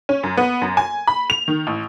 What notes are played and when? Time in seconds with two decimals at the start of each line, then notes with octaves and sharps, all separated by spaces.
0.09 C#4
0.23 F#2
0.37 B3
0.62 F#2
0.77 G#5
1.07 B5
1.30 F7
1.48 D#3
1.67 A1